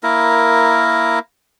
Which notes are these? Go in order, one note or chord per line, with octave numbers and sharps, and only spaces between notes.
A#3 E4 A#4